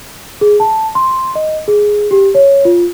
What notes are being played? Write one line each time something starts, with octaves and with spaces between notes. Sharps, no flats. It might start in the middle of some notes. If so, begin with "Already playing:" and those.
G#4
A5
C6
D#5
G#4
G4
C#5
F4